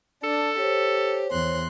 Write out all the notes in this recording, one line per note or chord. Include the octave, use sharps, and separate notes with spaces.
D4 A4
G4 C5 C#5
E2 C6 F#6